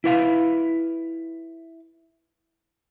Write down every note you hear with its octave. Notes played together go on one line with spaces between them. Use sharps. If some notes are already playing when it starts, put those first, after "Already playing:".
E4 B4 F5